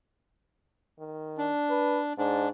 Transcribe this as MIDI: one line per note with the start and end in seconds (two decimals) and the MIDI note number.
0.99 1.49 51
1.38 2.13 62
1.70 2.01 71
2.18 2.47 44
2.18 2.49 62